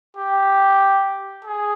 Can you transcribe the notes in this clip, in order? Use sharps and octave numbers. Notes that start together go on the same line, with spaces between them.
G4
G#4